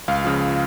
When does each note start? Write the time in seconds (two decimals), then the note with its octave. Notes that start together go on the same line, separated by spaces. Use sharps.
0.08 C#2 F5
0.24 C#3 F3